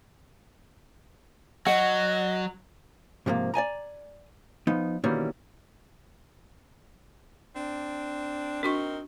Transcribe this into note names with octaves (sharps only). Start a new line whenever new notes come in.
F#3 D#5 F#5
G#2 C3 F3 G#3 A#3
D5 D#5 G#5 A#5
F3 B3 D#4
B2 D#3 E3 G3 A#3 C#4
C4 D4
C4 D4 D#4 F#4 A#4 C#6